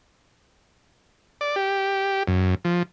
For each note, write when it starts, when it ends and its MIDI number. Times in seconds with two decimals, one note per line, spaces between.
1.41 1.56 74
1.56 2.23 67
2.28 2.55 42
2.65 2.83 53